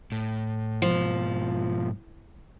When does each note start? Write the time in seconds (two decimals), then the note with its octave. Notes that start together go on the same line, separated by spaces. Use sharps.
0.12 A2
0.82 G#2 B2 F3